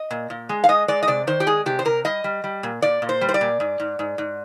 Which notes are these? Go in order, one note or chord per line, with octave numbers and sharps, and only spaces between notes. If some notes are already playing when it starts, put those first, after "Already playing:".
Already playing: D#5
A#2
A#2
G#3
F5
G#3 D#5
G#3 D5
D#5
C3 D5
D#3 C5
G4
G#3 G#4
C3 G4
C5
C3 A#4
G3 D#5
G3
G3
A#2
A#2 D5
A#2
C5
G3
C5
D5
A#2
G#2
G#2
G#2
G#2